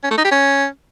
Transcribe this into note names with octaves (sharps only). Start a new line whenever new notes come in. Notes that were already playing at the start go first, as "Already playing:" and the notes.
C#4
A3
D#4
G4
C#4